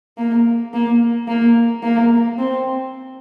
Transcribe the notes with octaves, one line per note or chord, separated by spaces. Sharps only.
A#3
A#3
A#3
A#3
C4